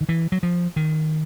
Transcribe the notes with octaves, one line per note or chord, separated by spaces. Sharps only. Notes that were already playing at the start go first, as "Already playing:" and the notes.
D#3
E3
F#3
F3
D#3